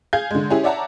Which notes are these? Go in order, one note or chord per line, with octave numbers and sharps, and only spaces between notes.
G#4 F5 G6 G#6
D3 G#3
C#4 E4 G4 G#4
C#5 D5 E5 F#5 A5 A#5